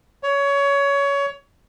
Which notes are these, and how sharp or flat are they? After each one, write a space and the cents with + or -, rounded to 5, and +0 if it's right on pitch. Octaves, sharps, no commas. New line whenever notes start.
C#5 +20